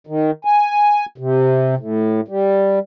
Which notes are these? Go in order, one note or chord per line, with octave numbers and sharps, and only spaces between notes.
D#3
G#5
C3
A2
G3